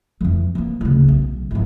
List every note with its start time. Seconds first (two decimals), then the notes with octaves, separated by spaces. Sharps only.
0.21 F2 E3
0.55 F3 A#3
0.81 D1 C#3
1.08 B1
1.51 G#1 F3